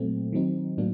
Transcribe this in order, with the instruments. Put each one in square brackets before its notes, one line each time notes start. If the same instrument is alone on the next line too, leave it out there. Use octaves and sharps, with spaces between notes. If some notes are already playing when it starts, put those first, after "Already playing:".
Already playing: [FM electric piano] A#2 F#3 A3 C4
D#3 F#3 C4 D#4
A2 F#3 A#3 D4